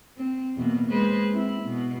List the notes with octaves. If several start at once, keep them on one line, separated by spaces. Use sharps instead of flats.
C4
E2 B2 A#3
G#3 B4 C5
C4 E4
B2